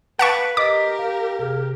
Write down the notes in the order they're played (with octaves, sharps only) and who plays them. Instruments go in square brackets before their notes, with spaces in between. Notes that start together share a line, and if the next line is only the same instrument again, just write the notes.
[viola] B4 [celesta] F5 B6 D7 [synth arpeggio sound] F#5 A5 C#6
[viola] G4 A#4 [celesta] D#5 B6 [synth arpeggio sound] D6 [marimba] A6
[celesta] F5
[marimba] C3 G#4 F6